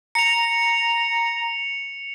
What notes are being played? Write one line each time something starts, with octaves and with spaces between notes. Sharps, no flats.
A#5 C#7 F7